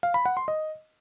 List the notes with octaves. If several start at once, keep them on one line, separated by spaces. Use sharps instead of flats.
F5
B5
F#5
C6
D#5